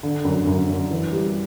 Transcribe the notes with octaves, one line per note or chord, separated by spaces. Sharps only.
D3
F#2
F#2
F#2
E3
G3